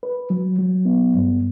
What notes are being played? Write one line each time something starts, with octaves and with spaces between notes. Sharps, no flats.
B4
F#3
F#3
B3
G2